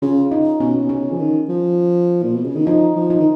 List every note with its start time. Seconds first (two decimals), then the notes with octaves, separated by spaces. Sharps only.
0.02 C#3 F4
0.32 D#4
0.60 B2 C#4
0.78 B2
0.89 C#3 C#4
1.12 F3
1.19 D#3
1.49 F3
2.23 A#2
2.34 B2
2.44 C#3
2.55 D#3
2.66 F3 D#4
2.96 F3
3.10 D#4
3.20 D#3